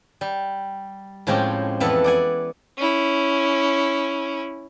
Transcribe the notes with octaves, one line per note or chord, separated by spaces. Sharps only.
G3
A2 F3 G#3 C4 C#4 G4
F2 E3 B3 A4 E5 F#5
D5 F#5 G#5
C#4 E4